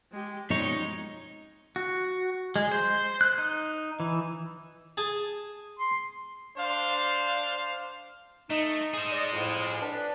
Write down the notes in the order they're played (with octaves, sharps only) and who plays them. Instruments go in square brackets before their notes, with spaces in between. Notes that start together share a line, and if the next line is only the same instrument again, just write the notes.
[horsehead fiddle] G#3 G4
[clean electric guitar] F2 B2 C#5 [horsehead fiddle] G#3 C#4 [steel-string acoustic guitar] D#4
[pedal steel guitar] F#4
G#3
C5
F#6
D#4
E3
[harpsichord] G#4 A5
[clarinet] C6
[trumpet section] D4 C5 F5
[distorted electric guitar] A3 [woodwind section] D#4
[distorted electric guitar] G#4 C5
[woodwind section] D5 D#5
F2 A2
D4 B4